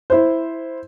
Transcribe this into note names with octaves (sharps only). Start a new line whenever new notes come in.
E4 C5